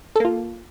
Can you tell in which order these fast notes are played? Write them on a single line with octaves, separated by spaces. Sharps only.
A4 A#3 F4